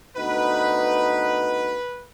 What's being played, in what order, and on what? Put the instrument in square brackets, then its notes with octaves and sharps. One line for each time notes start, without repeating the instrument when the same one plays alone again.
[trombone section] D2 B3 D#4 [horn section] B4